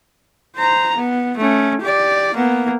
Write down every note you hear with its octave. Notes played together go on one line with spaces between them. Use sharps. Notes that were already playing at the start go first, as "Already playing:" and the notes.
C5 A#5
B3
A3 C#4
G4 D5
A#3 B3